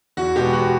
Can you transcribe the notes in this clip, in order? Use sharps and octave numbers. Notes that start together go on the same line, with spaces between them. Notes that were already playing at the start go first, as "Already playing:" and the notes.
E2 F#4
B2 G#3 B3 G4
E2 F#4